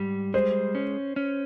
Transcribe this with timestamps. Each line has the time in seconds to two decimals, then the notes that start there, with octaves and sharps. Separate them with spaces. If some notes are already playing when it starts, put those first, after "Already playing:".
Already playing: G#2 G3
0.34 G#3 C5
0.75 C#4
1.16 C#4